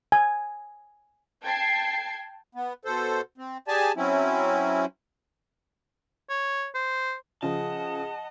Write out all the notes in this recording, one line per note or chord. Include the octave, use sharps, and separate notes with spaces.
G#5
G5 A5 G#6 C7
B3
B2 A4 C5
C4
G4 G#4 D5 G#5 A5
F#3 C4 C#4 E4
C#5
C5
C#3 F3 G#4 D#5 F#5 A5